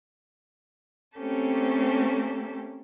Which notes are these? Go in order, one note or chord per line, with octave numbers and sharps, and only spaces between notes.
A3 A#3 C4 C#4 G4 A4